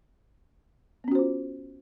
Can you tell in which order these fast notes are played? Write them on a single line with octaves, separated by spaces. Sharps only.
B3 C#4 F#4 C5 F4